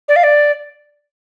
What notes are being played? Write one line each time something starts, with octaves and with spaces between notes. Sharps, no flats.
D5
F5
D5